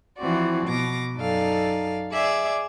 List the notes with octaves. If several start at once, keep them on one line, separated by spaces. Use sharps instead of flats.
E3 F3 C4 F#4 D5
B2 D6 A#6
F#2 D#4 A4 D5 F5
G#4 D5 E5 D6